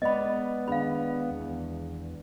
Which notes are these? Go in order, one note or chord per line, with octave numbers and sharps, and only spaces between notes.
G#3 B3 B4 D5 D#5 B5
D#3 D4 G#4 F5 B5
E2